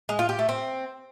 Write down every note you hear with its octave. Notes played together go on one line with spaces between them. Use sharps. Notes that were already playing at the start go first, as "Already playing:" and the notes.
G#3
F4
G4
A3
C4